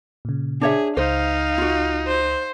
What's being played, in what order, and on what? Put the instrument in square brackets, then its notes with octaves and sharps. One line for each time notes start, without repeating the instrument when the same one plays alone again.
[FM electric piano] A#2 C#3
[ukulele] D4 C#5 E5 [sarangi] G#4
[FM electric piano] C#2 [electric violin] D#4 [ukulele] C5 [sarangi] F5
[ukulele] F4 F#4
[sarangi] C5